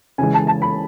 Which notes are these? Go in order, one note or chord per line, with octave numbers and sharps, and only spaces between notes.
C#3 E3 G#3 G#5
A5
A5
B5